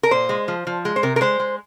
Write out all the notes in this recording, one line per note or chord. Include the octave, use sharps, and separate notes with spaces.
A#4
A#2 C5
G#3
F3
F3
G#3
C5
C3 A#4
A#4
G#3 C5
G#3